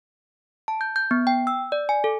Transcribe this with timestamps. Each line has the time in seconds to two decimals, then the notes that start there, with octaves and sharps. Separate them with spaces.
0.68 A5
0.81 G6
0.96 G6
1.11 B3
1.27 G5
1.47 E6
1.72 D5
1.89 G#5
2.04 A4